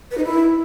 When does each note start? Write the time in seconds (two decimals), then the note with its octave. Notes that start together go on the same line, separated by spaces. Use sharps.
0.11 B4
0.18 D#4
0.24 E4